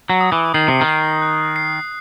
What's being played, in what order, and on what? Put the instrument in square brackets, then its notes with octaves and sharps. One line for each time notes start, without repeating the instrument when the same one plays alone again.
[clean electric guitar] F#3
[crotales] D#6
[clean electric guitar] E3
[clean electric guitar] D#3 [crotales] C7
[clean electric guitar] C3
D#3
[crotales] C7
F#6
C7